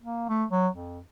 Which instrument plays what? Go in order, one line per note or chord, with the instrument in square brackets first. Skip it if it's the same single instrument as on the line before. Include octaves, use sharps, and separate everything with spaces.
[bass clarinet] A#3
A3
F#3
F2